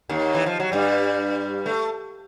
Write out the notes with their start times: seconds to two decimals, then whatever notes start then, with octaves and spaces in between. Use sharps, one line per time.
0.09 D#2 D#3
0.34 E3
0.46 F3
0.60 F#3
0.72 G2 G3
1.66 A3